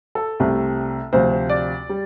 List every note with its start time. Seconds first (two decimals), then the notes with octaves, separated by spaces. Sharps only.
0.15 A4
0.40 C2 C3 A3
1.13 D2 C3 F3 C5
1.49 D5
1.90 G3